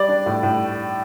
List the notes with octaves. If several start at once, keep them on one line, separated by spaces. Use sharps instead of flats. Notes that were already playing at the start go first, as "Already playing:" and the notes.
Already playing: G3 D5
D4
A2
A2